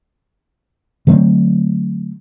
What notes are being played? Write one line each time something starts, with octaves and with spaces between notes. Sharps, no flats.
D3 F#3 A3 C4